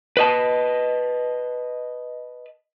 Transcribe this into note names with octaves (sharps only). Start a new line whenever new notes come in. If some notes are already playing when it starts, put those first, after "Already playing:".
B4 D#5 A5